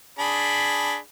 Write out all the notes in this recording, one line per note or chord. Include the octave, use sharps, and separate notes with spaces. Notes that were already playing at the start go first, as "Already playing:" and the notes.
D4 G#4 B5